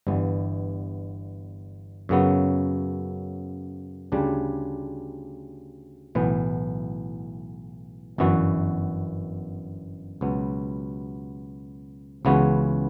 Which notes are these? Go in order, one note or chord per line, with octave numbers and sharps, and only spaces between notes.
G1 G2 E3 B3
F#2 C#3 F#3 B3
D2 C#3 G3 D4
B1 A2 E3 B3
G1 F#2 E3 B3 F#4
C#2 B2 F#3 B3
C#2 C#3 E3 B3 F#4